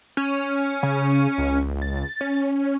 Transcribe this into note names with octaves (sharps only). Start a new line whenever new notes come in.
C#4
C#3
C#2
A6
C#4